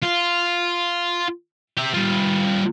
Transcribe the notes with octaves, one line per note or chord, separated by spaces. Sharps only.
F4
G4 E5
G3 F4